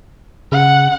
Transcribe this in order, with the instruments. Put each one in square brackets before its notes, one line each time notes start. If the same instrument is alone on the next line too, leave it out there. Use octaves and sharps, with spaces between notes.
[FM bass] C#3 [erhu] F#5